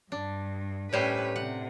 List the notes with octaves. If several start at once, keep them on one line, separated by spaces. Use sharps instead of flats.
G2 D4
A2 G3 C#4 B4 C5
C3 F#5